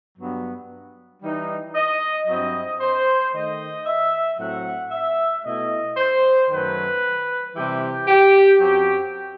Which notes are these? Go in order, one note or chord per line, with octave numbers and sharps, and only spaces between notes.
G2 F#3 B3
E3 G3 D#4
D#5
G2 F#3 C4 E4 D#5
C5
D#3 A3 D#4 D#5
E5
A2 F#3 C4 F#5
E5
B2 A3 E4 D#5
C5
F#2 D#3 F#3 A3 B4
C3 E3 G3 C4 G4
G4
F#2 F#3 C4 G4